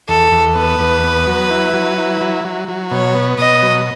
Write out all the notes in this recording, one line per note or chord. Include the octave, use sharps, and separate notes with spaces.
E2 A4
E2
B3 B4
E2
B3
F#3
E4
F#3
E4
F#3
F#3
F#3
B2 C#5
B3
B2 D#5
F#3